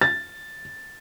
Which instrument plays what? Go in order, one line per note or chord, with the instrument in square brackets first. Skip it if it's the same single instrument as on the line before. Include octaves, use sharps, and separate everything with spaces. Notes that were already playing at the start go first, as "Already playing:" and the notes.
[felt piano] A6